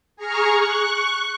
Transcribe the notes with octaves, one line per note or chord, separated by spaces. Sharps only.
G#4 A#5 C#6 F6
C#6 F#6